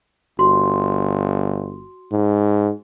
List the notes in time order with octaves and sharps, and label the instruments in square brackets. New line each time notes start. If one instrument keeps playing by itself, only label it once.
[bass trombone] G1 [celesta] F#4 C6
[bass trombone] G#2